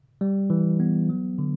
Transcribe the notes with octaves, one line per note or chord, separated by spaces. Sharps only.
G3
E3
B3
F#3
D3